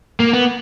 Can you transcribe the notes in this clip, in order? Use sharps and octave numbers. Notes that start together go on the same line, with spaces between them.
A#3
B3